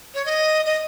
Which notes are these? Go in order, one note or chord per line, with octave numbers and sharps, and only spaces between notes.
C#5
D#5
D#5